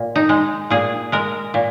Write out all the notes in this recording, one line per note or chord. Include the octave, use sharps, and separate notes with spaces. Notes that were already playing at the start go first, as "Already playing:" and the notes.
Already playing: A#2
D#4
G#3
A#2 G#4
G#3 A#4
A#2